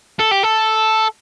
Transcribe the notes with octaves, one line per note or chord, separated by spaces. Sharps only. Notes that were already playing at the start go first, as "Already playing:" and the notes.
A4
G4
A4